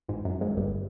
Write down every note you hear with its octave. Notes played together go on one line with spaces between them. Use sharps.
G#1 G#2
F#2
G#1 G#2
G1 G2